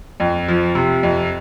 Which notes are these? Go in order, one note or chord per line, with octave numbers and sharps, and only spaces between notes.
F2
F3
C3
F2